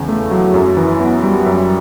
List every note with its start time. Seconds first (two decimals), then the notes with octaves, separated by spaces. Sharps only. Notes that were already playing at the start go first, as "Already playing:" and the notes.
Already playing: E2 C#3
0.08 A3
0.31 F#3
0.54 F#2
0.77 E3
1.00 B3
1.23 G3
1.46 F#2